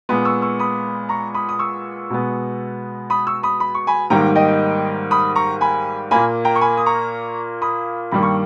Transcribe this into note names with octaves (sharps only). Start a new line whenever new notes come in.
A#2 G#3 B3 B5 D#6
C#6 E6
C#6 E6
B5 D#6
A#5 C#6
B5 D#6
D#6
C#6 E6
B2 G#3 B3
B5 D#6
C#6 E6
B5 D#6
B5
C#6
G#5 B5
G#2 D#3 G3 A#3 G5 A#5
D#5 G5
B5 D#6
A#5 C#6
G#5 B5
A#2 A#3 G#5 B5
G5 A#5
C#6
G#5 B5
D#6
A#5 C#6
B5 D#6
G2 D#3 G3 A#3 B5
C#6